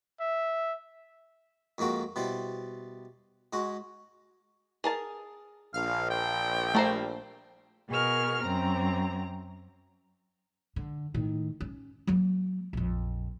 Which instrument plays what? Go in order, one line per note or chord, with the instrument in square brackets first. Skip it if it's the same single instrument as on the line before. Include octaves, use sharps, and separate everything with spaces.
[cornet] E5
[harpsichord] F2 G#2 A#3 F#4 G5
B2 G3 E4 C5
G#2 G#3 F#4
[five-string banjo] G#4 A#4 A5
[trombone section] A#1 [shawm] F5 [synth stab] F6
[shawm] G5
[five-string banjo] G3 A#4 [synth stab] A3 C5
[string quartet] B2 G#4 A#4 C#6 F6
F#2 C4 A#5
[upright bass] D3
A2 D#3
C#4
F#3 A#3
A#1 F2